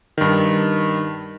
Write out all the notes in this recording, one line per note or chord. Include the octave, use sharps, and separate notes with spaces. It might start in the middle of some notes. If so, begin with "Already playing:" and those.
G2 D#3